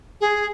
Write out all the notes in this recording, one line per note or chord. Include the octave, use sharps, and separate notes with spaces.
G#4